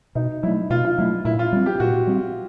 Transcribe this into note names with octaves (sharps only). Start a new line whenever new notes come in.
B2 D#4
F#3 A3 E4
B2 F4
F4
F#3 A3 E4
A#2 E4
F4
G3 C4
G4
A#2 F#4
G3 C4